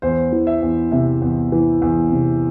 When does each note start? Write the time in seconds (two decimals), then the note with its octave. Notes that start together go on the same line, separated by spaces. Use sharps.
0.02 E2 C5
0.33 E3
0.47 E5
0.63 E2
0.92 C3 E5
1.22 E2
1.52 E3
1.82 E2
2.12 C3